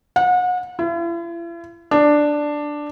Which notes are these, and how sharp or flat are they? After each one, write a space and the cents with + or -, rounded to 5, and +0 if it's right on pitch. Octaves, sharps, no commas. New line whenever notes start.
F#5 -35
E4 +45
D4 +5